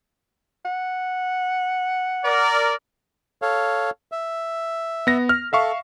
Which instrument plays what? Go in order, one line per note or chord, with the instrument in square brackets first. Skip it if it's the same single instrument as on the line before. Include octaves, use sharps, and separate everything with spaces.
[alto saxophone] F#5
[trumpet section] A#4 D5
[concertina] A4 C#5 F5
E5
[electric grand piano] B3 A#6
F6
[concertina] A4 [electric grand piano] E5 F5 C#6